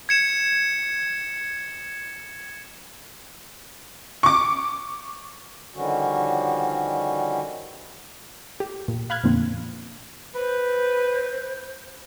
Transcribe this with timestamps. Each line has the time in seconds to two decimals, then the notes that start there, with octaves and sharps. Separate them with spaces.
0.09 G#6 C#7 E7
4.23 C#6 D6
5.74 D3 D#3 F3 G3 C#4 F#4
8.60 G4
8.88 A#2
9.10 F5 B5 F6 F#6 G#6
9.24 F2 A#2 D3 A#3 C4
10.35 B4 C5